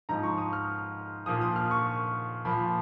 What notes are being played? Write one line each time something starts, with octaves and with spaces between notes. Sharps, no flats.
G#2 F3 A#5
C#6
D#6
F6
A#2 F3 D#6
D#6
F6
C#6
A#2 F3 B5